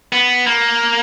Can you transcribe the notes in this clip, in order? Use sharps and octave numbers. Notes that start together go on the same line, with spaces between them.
B3
A#3